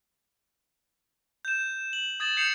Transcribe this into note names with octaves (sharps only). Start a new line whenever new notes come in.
G6 E7
F#7
D#6 G#6 A6 E7 F#7
G6 C7 C#7 E7 F7